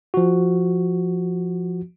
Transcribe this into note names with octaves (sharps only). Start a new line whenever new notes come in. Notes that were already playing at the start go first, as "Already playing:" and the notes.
F3 F#4